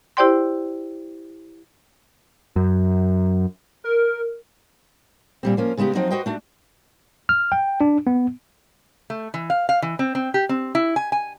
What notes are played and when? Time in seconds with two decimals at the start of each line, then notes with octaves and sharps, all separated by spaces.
0.17 E4 G4 C5 D5 G5 C6
2.56 F#2
3.84 A#4
5.43 A#2 G3 C4
5.57 F3 A#3 C#4
5.77 C#3 G#3 B3 D#4 G4
5.95 F3 F#3 C4 D#4 D#5
6.11 F#4 B4 C5 D#5 G5
6.26 A3 D4 F#4
7.29 F6
7.52 G5
7.81 D4
8.07 B3
9.10 A3
9.34 E3
9.50 F5
9.69 F5
9.82 E3
9.99 C4
10.15 C4
10.34 G4
10.49 C4
10.75 E4
10.96 G#5
11.12 G#5